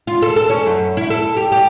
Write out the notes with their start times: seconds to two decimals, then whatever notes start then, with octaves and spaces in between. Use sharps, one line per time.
0.07 F4
0.22 A4
0.36 A4
0.50 C#4
0.66 F#2
0.97 E4
1.10 A4
1.37 G4
1.52 G4